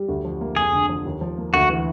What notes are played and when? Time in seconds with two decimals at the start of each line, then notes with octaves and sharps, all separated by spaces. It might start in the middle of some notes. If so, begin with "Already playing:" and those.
Already playing: G3
0.08 D2
0.25 F3
0.41 A#3
0.56 F1 G#4
0.73 D3
0.89 F3
1.05 D#2
1.21 F3
1.38 A#3
1.54 D2 F#4
1.69 E3